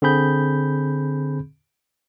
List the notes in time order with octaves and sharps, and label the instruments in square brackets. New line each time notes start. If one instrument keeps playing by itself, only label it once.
[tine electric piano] D3 C4 G#4 B5 G6